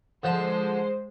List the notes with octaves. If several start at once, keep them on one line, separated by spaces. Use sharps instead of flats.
D3 F3 G#3 C5 A5